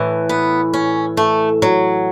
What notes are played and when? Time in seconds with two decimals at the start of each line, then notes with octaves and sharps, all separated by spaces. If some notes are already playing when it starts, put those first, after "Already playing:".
Already playing: A2 E3
0.29 B3
0.74 C#4
1.17 A3
1.62 F#3